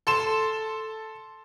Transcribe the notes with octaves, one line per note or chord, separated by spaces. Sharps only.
A4 C6 E7